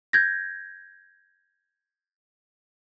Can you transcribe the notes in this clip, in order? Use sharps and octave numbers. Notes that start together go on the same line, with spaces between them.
G6 G#6 A#6